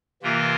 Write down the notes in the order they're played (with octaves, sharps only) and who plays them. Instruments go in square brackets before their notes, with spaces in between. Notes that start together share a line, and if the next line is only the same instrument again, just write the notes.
[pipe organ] C3 E3 A#3 F4 A#4